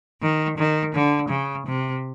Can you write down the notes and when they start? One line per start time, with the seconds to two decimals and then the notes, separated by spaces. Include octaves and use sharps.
0.21 D#3
0.57 D#3
0.93 D3
1.29 C#3
1.65 C3